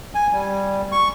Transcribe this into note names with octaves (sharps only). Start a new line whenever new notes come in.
G#5
G3
C#6